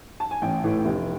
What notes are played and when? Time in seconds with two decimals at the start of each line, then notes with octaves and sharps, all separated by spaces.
0.20 A5
0.31 G#5
0.42 A1 G5
0.64 A2 E3
0.85 F1